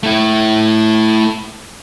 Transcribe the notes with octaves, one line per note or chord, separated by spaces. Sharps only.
A3 E4